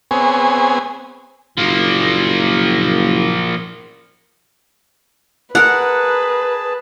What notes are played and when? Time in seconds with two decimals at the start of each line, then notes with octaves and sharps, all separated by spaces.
0.11 B3 C4 G#4 C#5 G#5
1.58 F#1 F3 A#3
5.55 G#4 A#4 B4 F#5 A5